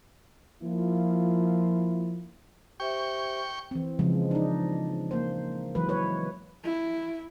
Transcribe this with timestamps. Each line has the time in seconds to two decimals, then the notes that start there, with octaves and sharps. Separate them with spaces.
0.63 F3 A#3 E4 F4
2.80 G4 C5 E5 G5 C#6
3.71 E3 C4
3.99 C#3 F3 G#3
4.31 D4 D#4
5.11 A#3 C5
5.75 E3 F#3 G#3 B4
5.89 B4 C#5
6.65 E4